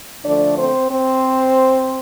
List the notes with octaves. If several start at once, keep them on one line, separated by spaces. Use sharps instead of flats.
D3 F3 A3 D4 D5
C4 C5
C4 C5